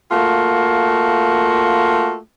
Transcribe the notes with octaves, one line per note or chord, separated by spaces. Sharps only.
A3 A#3 F4 F#4